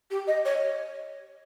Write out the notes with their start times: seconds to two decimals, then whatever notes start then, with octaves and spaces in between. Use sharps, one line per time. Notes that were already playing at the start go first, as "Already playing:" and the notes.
0.11 G4
0.27 D#5
0.45 C#5